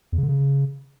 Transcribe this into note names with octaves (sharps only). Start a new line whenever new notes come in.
E2
C#3
D3
C#3